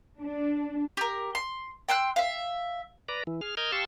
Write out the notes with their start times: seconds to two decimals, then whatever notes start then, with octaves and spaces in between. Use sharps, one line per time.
0.21 D4
0.97 G4 A#4
1.35 C6
1.89 G5 C6 E6 F#6
2.16 E5 F5
3.09 B4 D5 A#5
3.27 E3
3.41 G#4 F6
3.57 A#4 D#5 F6 G6 G#6
3.72 G4 F5 A5 C6 C#6 E6